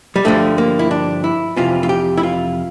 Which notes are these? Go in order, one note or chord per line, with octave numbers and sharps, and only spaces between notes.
G3
G2 D3 F3 A3
A#3
E4
D4
E4
F2 C3 E3 F4
F4
G4
E4
F4